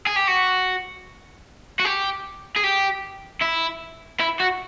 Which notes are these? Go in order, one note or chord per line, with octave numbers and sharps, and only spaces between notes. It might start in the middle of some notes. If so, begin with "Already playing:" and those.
G#4
G4
F#4
F#4
G4
G#4
G4
E4
E4
F#4